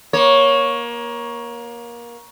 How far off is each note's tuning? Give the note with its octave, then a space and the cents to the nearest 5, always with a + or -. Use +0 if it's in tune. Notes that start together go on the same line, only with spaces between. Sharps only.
A#3 +25 C#5 +0